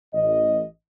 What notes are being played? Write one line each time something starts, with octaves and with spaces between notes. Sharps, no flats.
A1 D#5